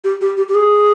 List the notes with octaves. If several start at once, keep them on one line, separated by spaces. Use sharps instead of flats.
G4
G4
G4
G4
G#4